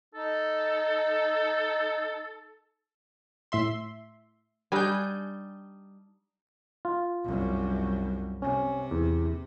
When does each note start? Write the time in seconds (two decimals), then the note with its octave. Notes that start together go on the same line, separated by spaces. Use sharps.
0.15 D#4 A4
3.52 A2 E5 C6
4.72 G3 D4 D#4 G#5 G6
6.85 F4
7.24 C2 F#2
8.42 C3 C#4
8.91 E2